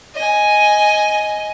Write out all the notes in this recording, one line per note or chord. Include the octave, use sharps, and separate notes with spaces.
D#5 G#5